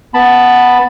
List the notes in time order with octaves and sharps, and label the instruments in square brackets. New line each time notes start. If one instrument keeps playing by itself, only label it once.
[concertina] B3 A5 B5